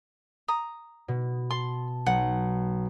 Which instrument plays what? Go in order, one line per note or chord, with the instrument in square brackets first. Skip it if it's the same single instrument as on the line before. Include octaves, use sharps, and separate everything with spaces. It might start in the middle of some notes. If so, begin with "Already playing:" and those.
[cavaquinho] A#5 D#6
[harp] B2
[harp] A5 [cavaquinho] C6
[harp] B1 [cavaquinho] F#5